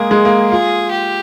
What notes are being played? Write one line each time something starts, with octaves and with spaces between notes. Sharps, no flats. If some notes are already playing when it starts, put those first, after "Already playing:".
Already playing: G#3 A#3 G#4
G#3
A#3
F4 G#4
G4